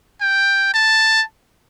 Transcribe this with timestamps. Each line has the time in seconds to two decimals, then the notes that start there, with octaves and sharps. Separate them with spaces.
0.21 G5
0.74 A5